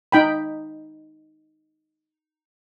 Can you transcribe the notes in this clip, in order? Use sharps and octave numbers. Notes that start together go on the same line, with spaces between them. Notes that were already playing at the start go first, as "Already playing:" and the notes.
D#4 G5 B5